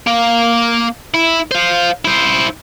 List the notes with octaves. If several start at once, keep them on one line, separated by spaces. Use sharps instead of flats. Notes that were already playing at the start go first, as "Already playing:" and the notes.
A#3
E4
C5 F5
E4 C5